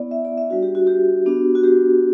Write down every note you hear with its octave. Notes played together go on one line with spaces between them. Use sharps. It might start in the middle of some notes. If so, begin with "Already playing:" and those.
Already playing: B3 E4 D5
E5
D5
E5
G3 D4 F#4
G4
F#4
G4
B3 D4 F#4
F#4
G4